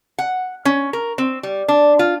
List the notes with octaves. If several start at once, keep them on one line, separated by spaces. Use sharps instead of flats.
F#5
C#4
A#4
C4
G3
D4
F4